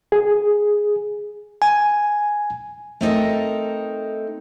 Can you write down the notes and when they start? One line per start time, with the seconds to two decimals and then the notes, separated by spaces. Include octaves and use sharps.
0.12 G#4
1.62 G#5
3.01 A3 C4 D#4 A4 A#4